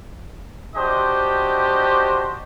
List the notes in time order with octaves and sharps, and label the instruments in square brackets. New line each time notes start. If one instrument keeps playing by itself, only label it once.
[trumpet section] D4 F#4 G4 C5 D#5